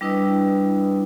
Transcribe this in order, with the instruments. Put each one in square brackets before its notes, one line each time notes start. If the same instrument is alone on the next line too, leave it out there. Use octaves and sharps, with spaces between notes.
[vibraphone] G3 D4 E4 B4 D#5 D#6